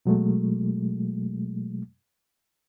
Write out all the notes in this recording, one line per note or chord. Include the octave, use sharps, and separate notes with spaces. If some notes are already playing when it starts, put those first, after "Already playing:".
B2 F#3 G#3 A3